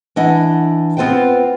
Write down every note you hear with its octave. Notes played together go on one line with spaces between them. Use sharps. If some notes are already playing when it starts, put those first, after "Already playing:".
E3 D4 D#5 F#5
B3 C4 F4 B4 C5 G5